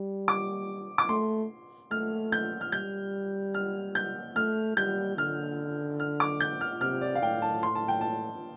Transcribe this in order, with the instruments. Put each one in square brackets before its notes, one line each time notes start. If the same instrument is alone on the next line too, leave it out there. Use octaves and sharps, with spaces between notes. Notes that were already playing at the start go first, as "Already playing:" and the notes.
Already playing: [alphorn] G3
[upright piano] D6
D6
[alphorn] A3 [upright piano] C6
[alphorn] A3 [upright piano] F6
[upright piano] G6
F6
[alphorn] G3 [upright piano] G6
[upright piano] F6
G6
[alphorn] A3 [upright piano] F6
[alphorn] G3 [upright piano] G6
[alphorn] D3 [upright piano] F6
[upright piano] F6
D6
G6
F6
[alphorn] C3 [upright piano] F6
[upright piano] D5
F5
[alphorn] A2 [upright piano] G5
[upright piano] A5
C6
A5
G5
A5